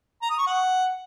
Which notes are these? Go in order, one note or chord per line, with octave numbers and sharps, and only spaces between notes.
A#5
D#6
C#6
F#5